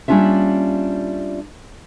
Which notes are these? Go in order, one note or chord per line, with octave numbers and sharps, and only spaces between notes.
G3 A#3 C#4 D4 F4 E5